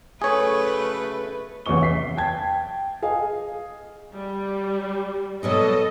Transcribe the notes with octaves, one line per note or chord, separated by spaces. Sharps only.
C#3 F#3 A3 G#4 B4 C#5
A1 E2 C3 C#5 C#6 G7
E5 B6 C7
G5 A5 G#6
G#4 D#5 F5 G#5
G3
B2 F#3 G3 A4 D#5